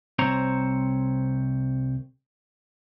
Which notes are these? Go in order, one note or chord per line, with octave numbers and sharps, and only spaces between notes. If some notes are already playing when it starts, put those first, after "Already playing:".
C2 C4 C5 C#5 A#5